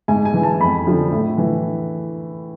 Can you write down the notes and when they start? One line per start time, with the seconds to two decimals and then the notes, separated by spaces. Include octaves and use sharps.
0.08 G#2 G#5
0.25 G#5
0.34 E3
0.43 A5
0.60 F2 B5
0.87 D3 F3
1.12 A2
1.38 E3